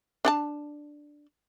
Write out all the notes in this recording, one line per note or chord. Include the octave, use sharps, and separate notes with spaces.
D4 F#5 A5